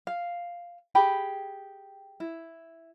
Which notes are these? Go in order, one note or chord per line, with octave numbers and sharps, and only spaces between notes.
F5
G4 G#4 G5 B5
E4